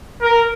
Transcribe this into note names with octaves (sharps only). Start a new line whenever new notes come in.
A#4